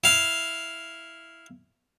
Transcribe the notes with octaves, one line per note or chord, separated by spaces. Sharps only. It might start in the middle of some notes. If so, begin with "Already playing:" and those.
E4 F5